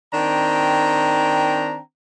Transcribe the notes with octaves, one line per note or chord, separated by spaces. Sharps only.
D#3 C4 D4 G5 A#5